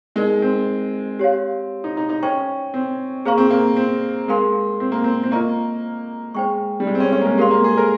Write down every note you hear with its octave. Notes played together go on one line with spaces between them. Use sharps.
G#3 D#4 A#4 D#5
C4
G4 C#5 F5
D#4
D#4
D#4
C#4 C5 G5 C#6
C4
A#3 G#4 C5 F5 A#5 C#6
C4
A#3
C4
G#3 A#4 F5 G#5 C6
C4
A#3
C4
C4
A#3 F4 C5 D#5 A#5 C#6
G#3 C5 G5 C#6
G3
G#3
C4
C#4
C#4
A#3
G#3
G#3 G4 A#4 F5 C6
A#3
G#4
A#4